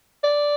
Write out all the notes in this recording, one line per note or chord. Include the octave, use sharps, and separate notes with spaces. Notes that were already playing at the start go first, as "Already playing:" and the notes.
D5